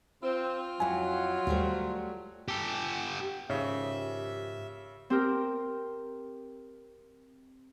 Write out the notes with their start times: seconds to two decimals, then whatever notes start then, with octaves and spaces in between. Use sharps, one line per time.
0.23 C4 F4
0.80 F2 F#3 E4 G#5
1.47 D#2 G3 A3 C5
2.48 G4 A4
3.50 D#2 G#2 C#3 F3 G4 E5
5.10 C4 G4 A#4